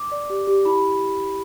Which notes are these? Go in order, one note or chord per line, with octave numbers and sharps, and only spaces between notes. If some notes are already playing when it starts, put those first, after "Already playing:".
Already playing: D6
D5
G4
G4
E4 B5